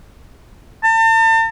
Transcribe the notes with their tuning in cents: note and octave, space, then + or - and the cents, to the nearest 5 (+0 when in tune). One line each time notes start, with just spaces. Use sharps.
A5 +40